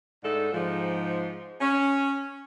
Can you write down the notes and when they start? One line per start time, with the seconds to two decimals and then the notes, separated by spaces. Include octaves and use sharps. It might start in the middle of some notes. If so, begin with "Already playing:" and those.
0.23 G#2 D3 A3 D#4 A4
0.53 G#2 F3
1.61 C#4